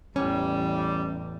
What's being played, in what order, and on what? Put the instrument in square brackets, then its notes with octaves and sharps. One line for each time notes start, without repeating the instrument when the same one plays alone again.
[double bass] A1 E2 [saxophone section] A2 G3 [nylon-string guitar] C#4